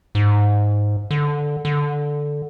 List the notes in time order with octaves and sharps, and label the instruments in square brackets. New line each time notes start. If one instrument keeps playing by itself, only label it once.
[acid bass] G#2
D3
D3